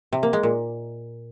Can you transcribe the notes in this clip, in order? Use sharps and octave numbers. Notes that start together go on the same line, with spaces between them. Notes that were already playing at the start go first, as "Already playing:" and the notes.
C3
A#3
G#3
A#2